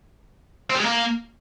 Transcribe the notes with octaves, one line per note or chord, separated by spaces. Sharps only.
C4
G3
G#3
A#3